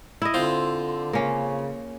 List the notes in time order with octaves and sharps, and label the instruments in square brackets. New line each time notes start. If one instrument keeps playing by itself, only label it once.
[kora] E4 D#5
[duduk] D3 [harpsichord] C4 F4 C5
[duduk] C#3 [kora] A#3 C#4